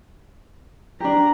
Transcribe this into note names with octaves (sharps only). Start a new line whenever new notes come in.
D4 G4 A#5